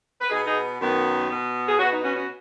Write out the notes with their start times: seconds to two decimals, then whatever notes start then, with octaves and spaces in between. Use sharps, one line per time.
0.21 B4
0.30 B2 B3 D#4 G#4
0.46 D#4 G#4
0.79 F#2 D#3 B3
1.29 B2 B3
1.67 G#4
1.78 B3 C#4 F#4
1.83 B2
1.91 D#4
2.03 C#4 F#4
2.16 C#4 F#4